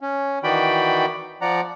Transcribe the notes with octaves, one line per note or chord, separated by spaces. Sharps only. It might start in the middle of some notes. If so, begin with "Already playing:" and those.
C#4
D#3 E3 F#4 D5 G5 B5
F3 D5 F#5 A#5